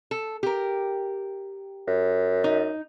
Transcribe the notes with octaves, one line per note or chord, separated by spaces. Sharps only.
A4
G4 A#4
F#2
D#4